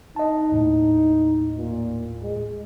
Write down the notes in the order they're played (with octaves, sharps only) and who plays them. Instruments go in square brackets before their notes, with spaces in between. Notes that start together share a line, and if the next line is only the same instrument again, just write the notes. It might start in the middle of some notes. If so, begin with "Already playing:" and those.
[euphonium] D#4 [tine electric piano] D#5 A5
[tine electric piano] D#2 A2
[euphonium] A#2
G#3